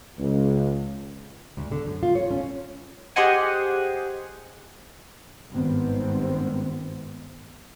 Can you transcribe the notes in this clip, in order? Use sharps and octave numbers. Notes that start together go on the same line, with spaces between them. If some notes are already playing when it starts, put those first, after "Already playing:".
C#2
D2
D3
F#2
F4
C#5
C#4
G4 G#4 C5 D#5 F#5 G#5
G#1 G2 D#3 B3 C4